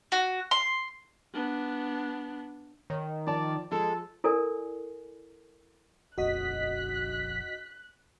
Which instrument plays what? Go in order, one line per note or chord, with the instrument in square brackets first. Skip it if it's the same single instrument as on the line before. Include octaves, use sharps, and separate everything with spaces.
[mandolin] F#4
C6
[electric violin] B3 D4
[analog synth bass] D#3 [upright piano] C#5
[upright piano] F3 A5 [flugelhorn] D5
[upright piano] F3 [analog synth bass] G#3 [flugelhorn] A4
[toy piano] E4 A4 A#4 D5 G#5
[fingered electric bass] D#1 A#1 F2 [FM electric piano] F#4 D#5 [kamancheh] F#6 [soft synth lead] B6